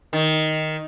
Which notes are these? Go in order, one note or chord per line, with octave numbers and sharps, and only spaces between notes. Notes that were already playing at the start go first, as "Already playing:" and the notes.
D#3